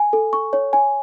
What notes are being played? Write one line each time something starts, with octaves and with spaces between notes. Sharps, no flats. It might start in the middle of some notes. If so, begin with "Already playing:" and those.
Already playing: G#5
A4
C#6
C#5
G#5